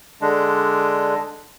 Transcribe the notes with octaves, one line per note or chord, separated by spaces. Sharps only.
D3 G#3 D4